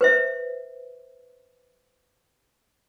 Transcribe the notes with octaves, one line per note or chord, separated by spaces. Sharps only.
B4 C5 E5